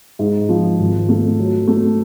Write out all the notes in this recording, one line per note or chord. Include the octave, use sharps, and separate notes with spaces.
G#2
F3
G#1
A3
F#3
A3